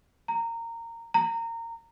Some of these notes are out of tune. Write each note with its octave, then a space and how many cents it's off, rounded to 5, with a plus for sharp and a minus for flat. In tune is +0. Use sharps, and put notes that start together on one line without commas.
A#5 -15
A#5 -20